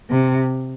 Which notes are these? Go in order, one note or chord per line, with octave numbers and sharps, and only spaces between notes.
C3